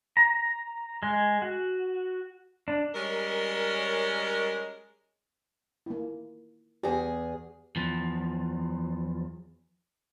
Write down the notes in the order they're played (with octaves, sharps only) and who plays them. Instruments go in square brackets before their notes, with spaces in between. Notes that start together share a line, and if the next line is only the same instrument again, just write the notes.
[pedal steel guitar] A#5
G#3
F#4
D4
[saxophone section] G3 G#3 C#4 A#4
[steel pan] A#3 E4
[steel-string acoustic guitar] E2 G#4 [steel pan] G4
[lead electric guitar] E2 F3